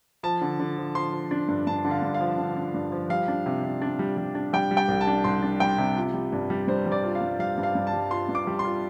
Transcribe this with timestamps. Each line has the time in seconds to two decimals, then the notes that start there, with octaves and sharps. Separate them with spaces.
0.23 F3 A5
0.41 D3
0.60 D3
0.78 F3
0.95 F3 C6
1.13 F3
1.31 D4
1.48 G2
1.67 G2 A5
1.85 D3
1.91 F5
2.02 G2
2.14 F5
2.20 F3
2.38 D3
2.56 D4
2.74 G2
2.92 F3
3.09 G3 F5
3.28 D4
3.46 C3
3.64 C3
3.82 D4
3.99 G3
4.17 G3
4.35 D4
4.53 G3 G5
4.71 G3
4.77 G5
4.88 C2
5.01 A5
5.07 D4
5.24 C2 C6
5.42 D4
5.60 G3 G5
5.78 C3
5.96 F4
6.14 G3
6.32 G2
6.50 G3
6.68 G2 C5
6.86 G3
6.92 D5
7.04 F4
7.15 F5
7.21 G2
7.39 G3 F5
7.58 G2
7.63 F5
7.75 G2
7.87 A5
7.93 G3
8.11 F4 C6
8.29 G2
8.35 D6
8.47 G3
8.59 C6
8.65 F4